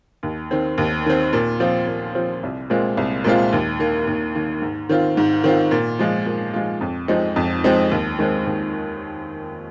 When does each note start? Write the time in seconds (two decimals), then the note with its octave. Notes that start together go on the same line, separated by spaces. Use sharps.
0.23 D#2
0.51 D#3 C4
0.78 D#2
1.06 D#3 C4
1.33 A#2
1.60 F3 C4 F4
1.87 A#2
2.15 F3 C4 F4
2.43 C2
2.70 A#2 G#3 C4 F4
2.97 C2
3.24 A#2 G#3 C4 F4
3.53 D#2
3.79 D#3 A#3
4.07 D#2
4.35 D#3 A#3
4.62 G#2
4.89 D#3 C4 F4
5.17 G#2
5.44 D#3 C4 F4
5.71 A#2
5.99 F3 G#3 F4
6.26 A#2
6.54 F3 G#3 F4
6.81 F2
7.08 F3 G#3 C4 D#4
7.36 F2
7.64 F3 G#3 C4 D#4
7.91 D#2
8.19 D#3 G#3 C4
8.46 D#2